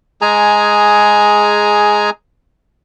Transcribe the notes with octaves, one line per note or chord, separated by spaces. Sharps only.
G#3 G#4 G#5 A#5